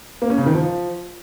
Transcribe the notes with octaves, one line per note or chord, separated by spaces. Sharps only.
A#3
C#4
C#3
D#3
F3